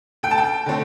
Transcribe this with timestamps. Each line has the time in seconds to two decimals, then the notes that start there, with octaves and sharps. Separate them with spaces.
0.23 D2 G5
0.31 A5
0.38 G5
0.66 D3 A3 C4